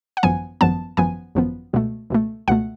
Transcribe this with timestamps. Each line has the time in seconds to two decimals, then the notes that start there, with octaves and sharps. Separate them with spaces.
0.17 F#5
0.23 G#1 F#2 F3 B3 G#5
0.61 G#1 F#2 F3 B3 A5
0.97 G#1 F#2 F3 B3 G#5
1.35 G#1 F#2 F3 B3
1.73 C#2 B2 A3
2.10 C#2 B2 A3
2.48 C#2 B2 A3 F#5